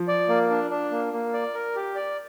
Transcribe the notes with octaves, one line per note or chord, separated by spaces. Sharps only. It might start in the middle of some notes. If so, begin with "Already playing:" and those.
Already playing: F3
D5
A#3
D4
D4
A#3
A#3
D5
A#4
G4
D5